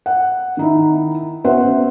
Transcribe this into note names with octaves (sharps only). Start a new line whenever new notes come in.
F#5
D#3 D#4 E4
B3 C#4 F#4 C5 E5 F#5